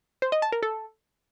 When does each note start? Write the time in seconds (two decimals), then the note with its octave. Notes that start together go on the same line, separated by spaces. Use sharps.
0.22 C5
0.32 D#5
0.42 A5
0.52 A#4
0.63 A4